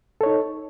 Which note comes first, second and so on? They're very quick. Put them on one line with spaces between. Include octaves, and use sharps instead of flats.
A4 C#5 D#4